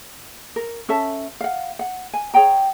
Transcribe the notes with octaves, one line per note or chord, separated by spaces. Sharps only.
A#4
C#4 A4 E5 A5
F5 F#5
F#5
G#5
G#4 C#5 G5 A#5